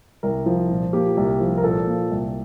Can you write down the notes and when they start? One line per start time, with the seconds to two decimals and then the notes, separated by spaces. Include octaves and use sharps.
0.23 C2 A#4
0.46 F3
0.70 A#2
0.93 A#3 G4
1.17 C2
1.40 F3
1.58 A#4
1.64 A#2 A4
1.87 A#3
2.11 C2